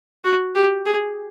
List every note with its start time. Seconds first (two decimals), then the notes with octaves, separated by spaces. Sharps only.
0.25 F#4
0.55 G4
0.86 G#4